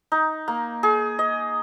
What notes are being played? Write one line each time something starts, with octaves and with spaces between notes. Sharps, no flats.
D#4
A#3
G#4
D#5